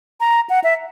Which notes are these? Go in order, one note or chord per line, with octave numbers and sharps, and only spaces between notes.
A#5
F#5
E5